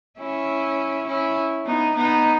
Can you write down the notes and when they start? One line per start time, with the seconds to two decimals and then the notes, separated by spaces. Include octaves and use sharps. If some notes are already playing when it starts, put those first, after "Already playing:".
0.19 C#4 E4
1.07 C#4 E4
1.66 B3 D#4
1.95 B3 D#4